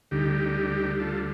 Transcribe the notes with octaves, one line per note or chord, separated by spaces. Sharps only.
D2 D3 G3 D#4 G4
F4 A4